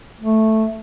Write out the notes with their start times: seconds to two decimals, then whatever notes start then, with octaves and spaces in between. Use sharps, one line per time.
0.21 A3